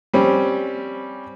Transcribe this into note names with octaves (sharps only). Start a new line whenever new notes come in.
G3 C4 C#4